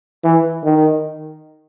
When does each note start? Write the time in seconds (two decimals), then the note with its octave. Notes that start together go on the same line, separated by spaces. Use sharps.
0.24 E3
0.64 D#3